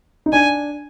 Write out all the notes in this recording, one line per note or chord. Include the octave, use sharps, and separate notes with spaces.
D#4
D4 G#5